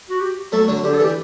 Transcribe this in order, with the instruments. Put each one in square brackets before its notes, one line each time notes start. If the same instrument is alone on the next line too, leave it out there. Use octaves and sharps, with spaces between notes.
[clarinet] F#4
G4
[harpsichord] F#3 A3 [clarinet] A4
[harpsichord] D3 F#3
[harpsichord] D3 [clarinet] G4
[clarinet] A4
[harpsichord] E3 [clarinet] G4